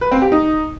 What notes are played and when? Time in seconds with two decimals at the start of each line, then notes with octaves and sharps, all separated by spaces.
0.01 B4
0.12 C4
0.22 G4
0.32 D#4